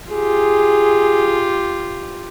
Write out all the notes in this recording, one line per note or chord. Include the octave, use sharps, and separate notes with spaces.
F4 G4 G#4